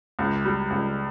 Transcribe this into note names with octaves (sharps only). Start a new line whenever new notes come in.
C#2
G3
C#2